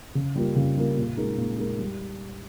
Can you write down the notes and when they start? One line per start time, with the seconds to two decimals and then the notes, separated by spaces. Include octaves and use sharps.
0.15 C#3
0.36 G3 A#3 F4 A#4
0.56 C#3
0.77 G3 A#3 F4 A#4
0.97 A#2
1.17 G#3 D#4 A#4
1.37 A#2
1.58 G#3 D#4 A#4
1.79 G3